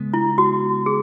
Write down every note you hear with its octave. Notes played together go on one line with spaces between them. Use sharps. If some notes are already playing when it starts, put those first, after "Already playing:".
Already playing: C#3 G#3 B3
E4
F#4
G#4